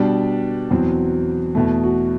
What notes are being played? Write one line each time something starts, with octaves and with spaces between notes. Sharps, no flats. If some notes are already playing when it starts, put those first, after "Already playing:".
Already playing: B2 G3 D4
E2 B2 F#3 C4
E2 B2 A3 E4
F#4